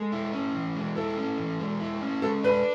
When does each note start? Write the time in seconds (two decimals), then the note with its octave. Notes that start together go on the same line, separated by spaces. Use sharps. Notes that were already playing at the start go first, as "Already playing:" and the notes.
Already playing: G#3 A4
0.12 E4
0.33 C#4
0.55 E3
0.75 G#3
0.96 E4 A4
1.17 C#4
1.38 E3
1.60 G#3
1.80 E4
2.01 C#4
2.22 G#3 A4
2.43 D4 B4